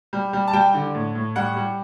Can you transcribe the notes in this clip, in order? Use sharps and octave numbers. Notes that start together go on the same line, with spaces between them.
G3
G3
A5
G3 G5
D3
A2
A2
G3 F#5
G3